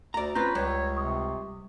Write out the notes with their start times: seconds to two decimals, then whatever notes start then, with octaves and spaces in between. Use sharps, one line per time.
0.14 D2 D5 A#5
0.35 C4 C#4 F4 B4 A#5 G6 A#6
0.55 C#2 G3 C#5
0.97 C3 C#6 D#6